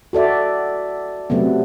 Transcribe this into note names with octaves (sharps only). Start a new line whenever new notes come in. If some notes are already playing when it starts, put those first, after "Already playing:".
F#4 A4 D5 E5
C3 F#3 A3 B3